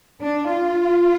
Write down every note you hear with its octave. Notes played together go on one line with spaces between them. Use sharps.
D4
F4